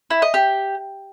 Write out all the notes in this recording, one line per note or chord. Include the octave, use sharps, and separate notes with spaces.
E4
D#5
G4